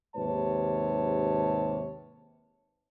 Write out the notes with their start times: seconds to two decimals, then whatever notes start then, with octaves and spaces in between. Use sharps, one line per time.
0.16 D#2 G#2 C3 B4 C#5 A5